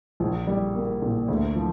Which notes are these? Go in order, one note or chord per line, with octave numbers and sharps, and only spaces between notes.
A#1
G3
A#3
A#2
D2
F3